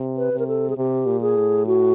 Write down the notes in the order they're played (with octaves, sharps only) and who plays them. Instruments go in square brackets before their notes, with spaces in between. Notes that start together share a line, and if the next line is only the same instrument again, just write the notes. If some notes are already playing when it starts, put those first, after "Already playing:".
Already playing: [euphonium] C3
[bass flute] B4
[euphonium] C3
[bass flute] A#4
A4
G#4
[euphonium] C3 [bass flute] G4
[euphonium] A#2
[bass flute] G#4
[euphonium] A2
[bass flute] F#4